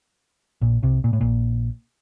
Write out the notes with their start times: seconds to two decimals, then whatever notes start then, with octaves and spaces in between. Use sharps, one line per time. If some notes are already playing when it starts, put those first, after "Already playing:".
0.61 A#1 A#2
0.83 C2 C3
1.04 A#2
1.13 A2
1.21 A#1 A#2